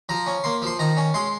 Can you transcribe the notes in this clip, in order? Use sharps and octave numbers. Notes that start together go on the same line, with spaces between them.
F3 A#5
C#4
A#3 C6
F3 C6
D#3 A#5
C#4
G#3 C6